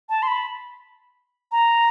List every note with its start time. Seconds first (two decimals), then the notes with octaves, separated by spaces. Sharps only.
0.09 A5
0.23 C6
0.28 B5
1.52 A#5